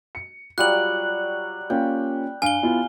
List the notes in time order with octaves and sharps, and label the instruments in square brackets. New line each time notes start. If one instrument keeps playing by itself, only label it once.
[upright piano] C#7
[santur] F#3 G3 F#5 [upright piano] F4 [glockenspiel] F#6 F#7
[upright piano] A#3 C#4 F4 [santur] G5
[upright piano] G2 D7 [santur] F5 [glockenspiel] G#5 G7
[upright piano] B3 E4 F4